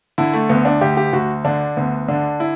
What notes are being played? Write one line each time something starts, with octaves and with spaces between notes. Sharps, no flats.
D3 E4
A3
D2 B3
D4
D2 G4
G4
D2 F#4
D3 D4
D2 B3
D3 D4
E4